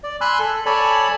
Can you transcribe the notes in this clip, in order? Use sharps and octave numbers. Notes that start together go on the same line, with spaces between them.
D5
G#5 B5 C6 E6 F#6
A4
A4 C#5 D5 G#5 A5 B5